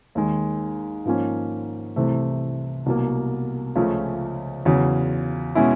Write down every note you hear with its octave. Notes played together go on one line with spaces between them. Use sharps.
D#2 D#3 G#3
G#2 F3 A#3 C#4
C2 C3 E3 A3
C2 B2 F#3 A#3
C#2 C#3 F3 A3 C#4
E2 C#3 F#3
B2 G#3 C#4 E4